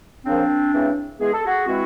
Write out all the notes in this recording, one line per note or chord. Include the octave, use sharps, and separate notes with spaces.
C#3 F3 A#3 C4 D4
C#3 E3 A3 C4
E3 G#3 B3 G#4
A4
F#4 G#4
E3 G#3 C4 E4 F#4